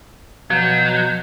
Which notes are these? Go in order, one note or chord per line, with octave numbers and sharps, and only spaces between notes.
B2 F3 F#3 G6